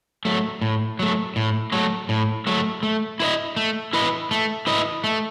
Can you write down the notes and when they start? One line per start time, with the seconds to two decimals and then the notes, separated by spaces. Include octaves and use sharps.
0.25 F#3 A3
0.62 A2
0.99 F#3 A3
1.36 A2
1.72 F#3 A3
2.09 A2
2.47 F#3 A3
2.83 A3
3.20 E4 B4 D#5
3.56 A3
3.93 E4 B4 D#5
4.31 A3
4.67 E4 B4 D#5
5.04 A3